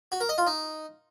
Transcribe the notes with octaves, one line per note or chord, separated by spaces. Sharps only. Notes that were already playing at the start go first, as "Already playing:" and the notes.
F#4
A#4
D#5
F4
D#4